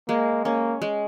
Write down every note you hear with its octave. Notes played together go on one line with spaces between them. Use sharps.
G#3 A#3
A#3 C#4
G#3